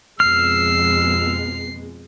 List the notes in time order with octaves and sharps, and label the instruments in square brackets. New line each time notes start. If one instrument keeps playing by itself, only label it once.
[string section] F2 B2 G#3 [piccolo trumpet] E6 [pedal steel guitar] F6 [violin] C7